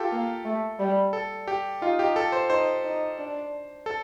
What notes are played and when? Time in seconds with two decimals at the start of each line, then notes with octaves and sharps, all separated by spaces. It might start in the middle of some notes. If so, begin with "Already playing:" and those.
Already playing: F4 G4 A4
0.12 A#3
0.45 A3
0.79 G3
1.13 A4
1.48 G4
1.82 D#4 F4
1.99 G4
2.16 A4
2.32 C5
2.49 D#4 C5
2.84 D#4
3.18 D4
3.86 A4